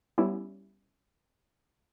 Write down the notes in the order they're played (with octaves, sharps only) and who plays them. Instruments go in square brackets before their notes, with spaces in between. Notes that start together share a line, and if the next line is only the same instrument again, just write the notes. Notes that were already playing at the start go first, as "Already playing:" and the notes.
[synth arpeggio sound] G3 B3 C#4 E4 G4